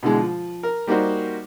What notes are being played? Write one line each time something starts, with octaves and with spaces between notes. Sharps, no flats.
B2 D3 E3 G#3
F3
A#4
G3 A#3 D#4 F#4 C5